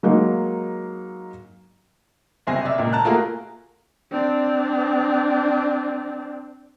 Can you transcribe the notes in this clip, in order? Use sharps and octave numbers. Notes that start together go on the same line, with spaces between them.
F#3 G#3 A#3 D#4 A#4
F#1 C2 C4 G#5 A#6
D5 E5
C#2 A#2
A5 A#5 F#6
A3 A#3 F4 F#4 G#4 A#4
C4 D4